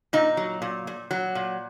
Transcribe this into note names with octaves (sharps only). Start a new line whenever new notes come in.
A#2 D#4
F#3
A#2
A#2
F#3
A#2